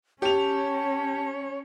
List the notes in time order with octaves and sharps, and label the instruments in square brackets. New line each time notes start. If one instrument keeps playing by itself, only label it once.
[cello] C#4 [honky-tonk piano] G4 F7 [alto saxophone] C#5 [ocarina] A5